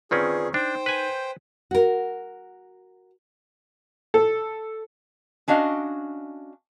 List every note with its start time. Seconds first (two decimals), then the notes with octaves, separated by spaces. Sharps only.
0.11 D#3 C4 C#4 F4 G#4 B4 D5
0.54 D4 D#4 C5 G5
0.86 B4 G#5
1.71 F#4 A#4
4.14 A4
5.48 C#4 D4 F#4 D#5 F5